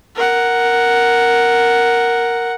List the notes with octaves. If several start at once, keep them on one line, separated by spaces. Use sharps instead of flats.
A#4 F#5